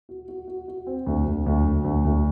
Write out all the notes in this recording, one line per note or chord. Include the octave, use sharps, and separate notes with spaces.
F#4
F#4
F#4
F#4
C4
D2
D2
D2
D2
D2
D2